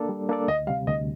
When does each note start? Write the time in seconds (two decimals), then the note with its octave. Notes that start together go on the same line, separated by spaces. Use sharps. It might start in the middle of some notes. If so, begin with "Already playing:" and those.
Already playing: A#3 D4 A4 D5
0.09 G3
0.29 A#3 D4 A4 D5
0.48 D2 D#5
0.67 C3 G3 F5
0.87 D2 D#5